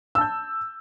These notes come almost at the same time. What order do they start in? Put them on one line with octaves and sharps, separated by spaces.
E6 A5 G6